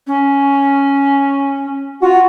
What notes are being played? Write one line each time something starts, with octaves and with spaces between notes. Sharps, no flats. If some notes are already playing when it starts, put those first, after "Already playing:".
C#4
F4 F#4